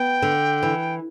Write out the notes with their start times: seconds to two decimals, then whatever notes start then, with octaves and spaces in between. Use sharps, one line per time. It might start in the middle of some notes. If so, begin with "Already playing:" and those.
Already playing: B3 G5
0.22 D3
0.63 E3